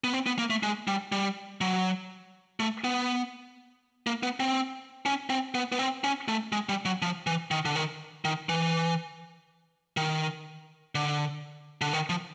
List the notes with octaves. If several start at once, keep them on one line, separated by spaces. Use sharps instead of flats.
B3
C4
B3
A#3
A3
G#3
G3
G3
F#3
A3
B3
A#3
B3
C4
C#4
C4
B3
B3
C4
C#4
A3
G#3
G3
F#3
F3
E3
D#3
D3
D#3
D#3
E3
D#3
D3
D3
D#3
F3